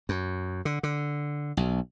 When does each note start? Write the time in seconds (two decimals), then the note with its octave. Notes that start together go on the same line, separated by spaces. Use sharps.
0.09 F#2
0.65 D3
0.83 D3
1.57 B1